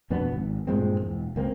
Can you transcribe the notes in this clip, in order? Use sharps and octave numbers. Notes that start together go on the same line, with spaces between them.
F2 B2 B3 D4
G#1
G2 A#2 G#3 C4
E1
C#2 A#3 C4